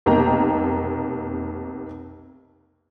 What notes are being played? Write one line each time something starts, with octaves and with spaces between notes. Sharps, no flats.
F1 B1 C3 A#3 G5 A#5